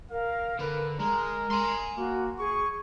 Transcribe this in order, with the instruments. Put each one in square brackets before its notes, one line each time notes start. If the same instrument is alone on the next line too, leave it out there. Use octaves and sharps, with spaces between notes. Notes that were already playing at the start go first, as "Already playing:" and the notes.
[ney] A#4 [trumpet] F5
[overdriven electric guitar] D3 [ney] A#4 [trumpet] B4
[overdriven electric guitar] G#3 [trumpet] A#4 [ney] A#5
[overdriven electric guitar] G#5 C6
[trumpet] A#3 [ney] F#4
[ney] G#4 [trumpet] C#6